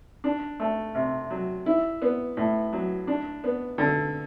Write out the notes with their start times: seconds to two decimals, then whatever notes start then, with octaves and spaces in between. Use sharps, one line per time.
0.24 D4
0.60 A3
0.95 C3
1.30 F#3
1.66 E4
2.02 B3
2.37 A2
2.73 F#3
3.07 D4
3.44 B3
3.78 D3